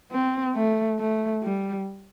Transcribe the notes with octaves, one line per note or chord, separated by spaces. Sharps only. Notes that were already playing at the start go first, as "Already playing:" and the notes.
C4
A3
A3
G3